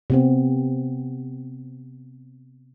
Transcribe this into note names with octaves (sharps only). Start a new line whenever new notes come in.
C3 B3 C4